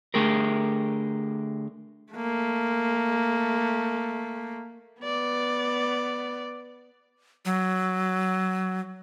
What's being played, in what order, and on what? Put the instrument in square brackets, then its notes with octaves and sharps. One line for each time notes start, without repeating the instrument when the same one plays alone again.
[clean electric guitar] D3 A3 G4 G#4 A#4
[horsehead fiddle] A3 A#3
[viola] B3 D5
[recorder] F#3